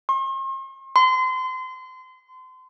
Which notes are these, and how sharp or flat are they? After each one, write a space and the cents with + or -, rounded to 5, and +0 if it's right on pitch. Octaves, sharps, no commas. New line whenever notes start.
C6 +45
C6 -30